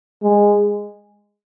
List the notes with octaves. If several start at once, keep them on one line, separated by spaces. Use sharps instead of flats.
G#3